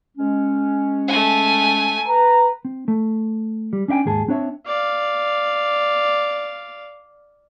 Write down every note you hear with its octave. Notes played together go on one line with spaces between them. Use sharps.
G#3 C#4
A3 G#5
B4 A#5
C4
A3
G3
C#4 D4 E5 G5 G#5
D#2 G#2 G#4 A5
C4 D4 C#5 E5
D5 F5